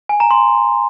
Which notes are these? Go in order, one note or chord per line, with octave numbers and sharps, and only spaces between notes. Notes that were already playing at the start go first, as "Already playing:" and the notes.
G#5
A#5
C6